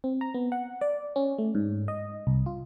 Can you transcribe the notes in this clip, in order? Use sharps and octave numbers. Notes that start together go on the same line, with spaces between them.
C4
A#5
B3
F#5
D5
C#4
A3
G#2
D#5
C2
F4